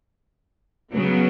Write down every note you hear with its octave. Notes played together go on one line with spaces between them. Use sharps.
C#3 F#3 B3